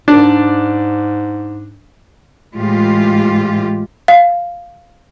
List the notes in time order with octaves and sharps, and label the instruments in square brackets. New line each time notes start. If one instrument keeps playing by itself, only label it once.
[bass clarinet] G#2 [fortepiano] D4
[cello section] A2 E3 G#3 F4 G4
[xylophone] F5